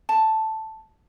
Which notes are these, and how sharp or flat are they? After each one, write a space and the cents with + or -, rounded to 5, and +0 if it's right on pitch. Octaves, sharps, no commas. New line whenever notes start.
A5 +0